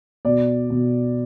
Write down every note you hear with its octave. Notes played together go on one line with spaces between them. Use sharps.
B2 D5
B2